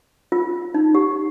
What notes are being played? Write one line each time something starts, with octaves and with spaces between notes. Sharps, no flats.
F4
D#4
G4